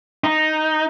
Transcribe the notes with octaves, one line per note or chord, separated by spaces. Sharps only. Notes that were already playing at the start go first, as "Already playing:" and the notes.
D#4